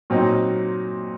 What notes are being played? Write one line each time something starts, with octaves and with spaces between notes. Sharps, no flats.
A#2 F#3 C4 D#4